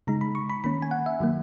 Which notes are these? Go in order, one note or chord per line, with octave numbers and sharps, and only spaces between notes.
C#3 G#3 D#4 A#5
B5
C#6
B5
D#3 A#3 C#4 B5
G#5
F#5
E5
D#3 F#3 A#3